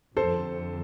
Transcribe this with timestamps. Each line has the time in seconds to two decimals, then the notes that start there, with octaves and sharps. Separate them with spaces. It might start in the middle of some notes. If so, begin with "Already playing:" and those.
0.16 F2 D3 A4 C5